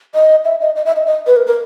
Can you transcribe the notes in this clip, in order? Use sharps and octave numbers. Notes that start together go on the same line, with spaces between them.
D#5
E5
D#5
D#5
E5
D#5
D#5
B4
A#4
A#4